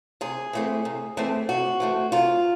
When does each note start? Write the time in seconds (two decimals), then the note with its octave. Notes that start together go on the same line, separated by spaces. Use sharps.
0.21 C3 G#4
0.53 E3 A3 C4
0.85 C3
1.17 E3 A3 C4
1.49 C3 F#4
1.80 E3 A3 C4
2.12 C3 F4